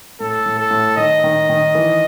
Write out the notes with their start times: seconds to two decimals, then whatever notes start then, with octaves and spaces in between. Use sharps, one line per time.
0.20 A2 A4
0.46 A2
0.59 A4
0.71 A2
0.97 D#3 D#5
1.24 D#3
1.49 D#3
1.75 E3